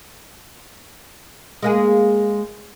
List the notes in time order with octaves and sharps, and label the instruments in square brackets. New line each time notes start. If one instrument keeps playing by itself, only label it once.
[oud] G#3 A#3 G#4